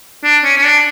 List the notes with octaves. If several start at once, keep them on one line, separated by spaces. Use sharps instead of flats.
D4
C#4
C#4
D4